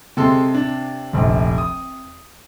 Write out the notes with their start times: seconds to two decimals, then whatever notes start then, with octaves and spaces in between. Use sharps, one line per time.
0.17 C3 G#3 A4 C6
0.55 D4
1.13 F1 A#1
1.58 D#6